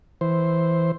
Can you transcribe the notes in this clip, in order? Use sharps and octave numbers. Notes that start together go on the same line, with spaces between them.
E3 C5